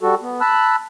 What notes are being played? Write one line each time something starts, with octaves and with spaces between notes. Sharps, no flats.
G3 F#4 A4
B3
A5 B5 E6 F#6